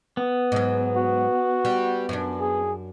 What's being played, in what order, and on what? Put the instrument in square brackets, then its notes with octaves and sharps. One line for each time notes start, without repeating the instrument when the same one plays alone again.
[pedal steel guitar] B3
[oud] G#2 F#3
[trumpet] F#4
[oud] G3
F#2 D4
[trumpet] G#4